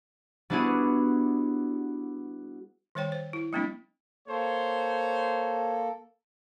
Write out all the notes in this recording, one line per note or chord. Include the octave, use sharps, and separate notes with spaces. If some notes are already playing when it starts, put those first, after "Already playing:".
G3 B3 D4 E4 F#4 G#4
D#3 G3 C5 C#5 G5
C5
E4
F#3 G3 A#3 C4 D4 E4
A#3 A4 C5 C#5